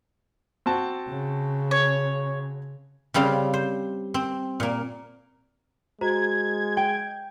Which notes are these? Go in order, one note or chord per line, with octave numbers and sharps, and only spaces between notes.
C4 F#4 A5
C#3
C#5
C#3 G3 C4 F5
C5
C4
A#2 A#3
G#3 F#4 C5 A#5 G#6
G5